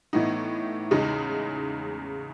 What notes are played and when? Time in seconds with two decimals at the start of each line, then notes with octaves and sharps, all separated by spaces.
0.13 A2 E3 B3 D#4
0.91 E2 C#3 G#3 D#4